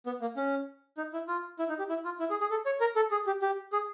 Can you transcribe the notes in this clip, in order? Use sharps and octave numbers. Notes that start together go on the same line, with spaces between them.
B3
A#3
C#4
D#4
E4
F4
E4
D#4
G4
E4
F4
E4
G#4
G#4
A4
C#5
A#4
A4
G#4
G4
G4
G#4